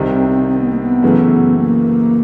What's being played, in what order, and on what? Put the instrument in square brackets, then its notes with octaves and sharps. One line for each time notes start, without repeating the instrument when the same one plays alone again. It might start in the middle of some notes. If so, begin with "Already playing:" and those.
Already playing: [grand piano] C2 C3 D#3
[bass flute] C4
C4
C4
B3
A#3
B3
[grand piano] F#2 C#3 E3 A3
[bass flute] A#3